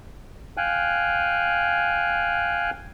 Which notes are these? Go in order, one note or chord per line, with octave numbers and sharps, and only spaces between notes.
F5 G5 G#5 F#6